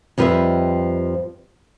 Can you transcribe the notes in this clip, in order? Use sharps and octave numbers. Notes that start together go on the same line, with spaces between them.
F2 F3 G3 B4 D#5 E5